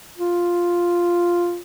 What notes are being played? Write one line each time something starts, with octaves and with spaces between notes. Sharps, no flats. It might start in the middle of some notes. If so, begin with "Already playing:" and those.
F4